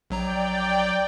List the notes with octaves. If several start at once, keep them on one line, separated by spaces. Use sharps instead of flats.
A#1 F#3 D5 G5 A#5